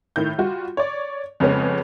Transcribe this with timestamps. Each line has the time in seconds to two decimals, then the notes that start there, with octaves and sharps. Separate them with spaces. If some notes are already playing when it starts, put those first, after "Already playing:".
0.16 A2 D#3 G6
0.38 G3 F4 F#4
0.77 C#5 D5
1.40 F2 C#3 G#3 B3 C#4